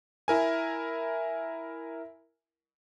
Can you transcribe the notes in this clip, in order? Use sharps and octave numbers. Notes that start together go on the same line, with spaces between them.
E4 A#4 G#5